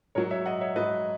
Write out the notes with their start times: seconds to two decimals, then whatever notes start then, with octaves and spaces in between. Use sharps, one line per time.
0.15 G#2 F#3 A#4 C#5
0.31 C#5 E5
0.46 D#5 F#5
0.61 C#5 E5
0.76 G#2 F#3 B4 D#5